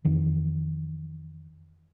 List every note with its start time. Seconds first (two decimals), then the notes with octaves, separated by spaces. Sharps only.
0.05 F2 D#3 E3